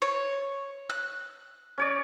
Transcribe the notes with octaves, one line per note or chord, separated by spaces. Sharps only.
C#5
F#6
C#4 C#5 D5